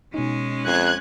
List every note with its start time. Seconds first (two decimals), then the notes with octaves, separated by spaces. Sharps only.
0.14 B2 G#3 C#4 D#4
0.65 F2 F#6 G#6